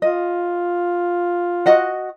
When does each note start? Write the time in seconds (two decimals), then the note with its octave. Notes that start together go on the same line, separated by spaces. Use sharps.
0.02 F4 D#5
1.66 F#4 D#5 F#5